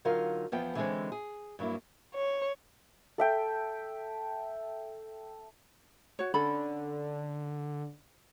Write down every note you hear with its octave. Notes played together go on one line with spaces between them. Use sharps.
D3 F#3 D#4 F4 A#4 F5
E2 F3 B3 G5
D3 E3 G3 G#3 C4 C#4
G#4
G2 F#3 A#3 E4
C#5
A4 E5 G5
F#4 C#5
D3 C#4 A4 B5